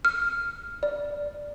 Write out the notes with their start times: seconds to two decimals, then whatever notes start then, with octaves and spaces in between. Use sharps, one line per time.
0.05 F6
0.83 D5